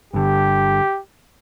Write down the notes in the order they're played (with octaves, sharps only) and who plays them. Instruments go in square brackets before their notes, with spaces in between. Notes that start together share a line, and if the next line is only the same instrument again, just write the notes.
[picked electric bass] G1 G2 D3 [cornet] G4